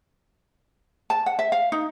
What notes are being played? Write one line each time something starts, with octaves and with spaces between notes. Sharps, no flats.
A5
F#5
E5
F5
D#4